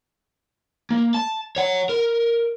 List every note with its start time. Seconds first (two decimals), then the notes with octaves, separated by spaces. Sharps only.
0.91 A#3
1.14 A5
1.56 C#5 F#5
1.89 A#4